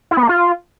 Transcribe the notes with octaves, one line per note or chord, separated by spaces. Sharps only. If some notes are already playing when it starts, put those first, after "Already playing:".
E4
B3
A#3
F4